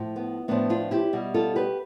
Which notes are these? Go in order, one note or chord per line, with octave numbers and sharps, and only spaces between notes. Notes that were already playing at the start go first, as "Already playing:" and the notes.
Already playing: A2 F3
B3
A2 F3 B3 D4
D4 F4
E4 G4
B2 G3
F4 A4
G4 B4